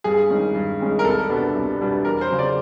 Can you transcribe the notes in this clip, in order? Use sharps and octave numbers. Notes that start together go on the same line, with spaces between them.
G2 G#4
D#3 G#3 C#4
G2
D#3 G#3 C#4
A#4
C2 A4
B2 G3 B3 D4
C2
B2 G3 B3 D4
E2 A#4
C5
C#3 F#3
D5